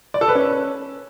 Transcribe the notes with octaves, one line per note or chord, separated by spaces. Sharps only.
D5
A4
B4
C#4